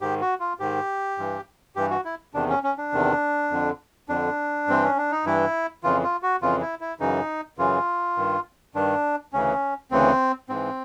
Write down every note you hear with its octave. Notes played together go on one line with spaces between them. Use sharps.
G#2 D#3 G4
F#4
F4
G#2 D#3 G4
G2 E3
G2 E3 G4
F#4
E4
E2 C3 D#3 D4
C#4
C#4
D4
E2 C3 D#3
F2 D3
F2 D3 D4
G2 E3 C4
C#4
D4
D#4
G2 E3 E4
F2 C#3 E3 F4
F4
F#4
F2 C#3 E3 F4
E4
E4
F#2 C#3 E3 D#4
F#2 C#3 E3 F4
G2 D#3
G2 D#3 D4
D2 C#3 E3 C#4
D2 C#3 E3 C4
G#2 E3 C4